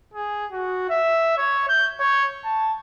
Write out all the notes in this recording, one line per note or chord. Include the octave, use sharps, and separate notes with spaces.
G#4
F#4
E5
C#5
G6
C#5
A5